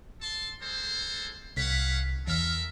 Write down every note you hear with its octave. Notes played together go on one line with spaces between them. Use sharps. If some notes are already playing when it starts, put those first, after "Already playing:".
A4 A5 C6
G#3 A4 C5
C2 C#4 F5 F#5 B6
E2 A4 A#4 E5 F6